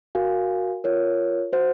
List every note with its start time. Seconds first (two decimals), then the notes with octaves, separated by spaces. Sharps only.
0.15 F#4 A#4 F5 G#5
0.84 F4 A#4 C#5
1.52 F#4 C5 F#5